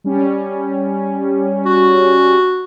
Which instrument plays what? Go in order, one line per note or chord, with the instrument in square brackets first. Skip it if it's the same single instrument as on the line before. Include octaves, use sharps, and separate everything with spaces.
[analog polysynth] G3 C#4
[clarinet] F#4